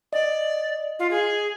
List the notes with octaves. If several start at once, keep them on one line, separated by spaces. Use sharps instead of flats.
D5 D#5
F4
G#4